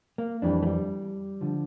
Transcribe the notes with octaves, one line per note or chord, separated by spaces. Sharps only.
A#3
F2 E3 G3 D4
A3
G3
D3 F3